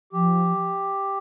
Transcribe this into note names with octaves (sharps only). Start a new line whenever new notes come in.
F3 G4